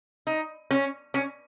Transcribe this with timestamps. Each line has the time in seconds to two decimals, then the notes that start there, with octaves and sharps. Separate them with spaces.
0.27 D#4
0.71 C#4
1.14 C#4